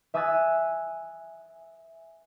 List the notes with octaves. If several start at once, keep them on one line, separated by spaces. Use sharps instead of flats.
E5 G#5 D#6 E6 F#6 A6